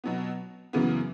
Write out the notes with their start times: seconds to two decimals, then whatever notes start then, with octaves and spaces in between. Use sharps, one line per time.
0.04 B2 F#3 B3
0.73 F#2 C#3 E3 B3